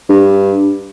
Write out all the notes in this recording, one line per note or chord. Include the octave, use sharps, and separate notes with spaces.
G2